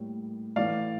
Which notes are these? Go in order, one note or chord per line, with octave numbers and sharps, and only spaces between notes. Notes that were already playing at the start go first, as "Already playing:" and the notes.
Already playing: A2 G3 A#3
A2 E3 A3 D5 F5